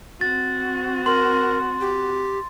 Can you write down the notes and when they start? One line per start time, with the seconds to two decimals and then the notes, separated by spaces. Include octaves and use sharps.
0.21 C4 F#4 A6
1.06 A#4 C6
1.81 G4